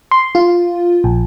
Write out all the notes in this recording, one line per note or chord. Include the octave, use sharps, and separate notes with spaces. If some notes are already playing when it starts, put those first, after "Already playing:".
C6
F4
A#1